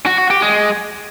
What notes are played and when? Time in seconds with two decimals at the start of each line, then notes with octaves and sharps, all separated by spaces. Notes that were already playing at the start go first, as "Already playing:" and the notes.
0.06 F#4
0.18 F#4
0.30 G4
0.42 G#3